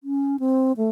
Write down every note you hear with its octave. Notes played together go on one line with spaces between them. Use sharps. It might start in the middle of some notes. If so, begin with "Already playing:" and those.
C#4
C4
A3